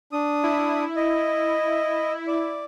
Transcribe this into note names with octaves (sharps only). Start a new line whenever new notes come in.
D4 D#6
E4
D#5
D5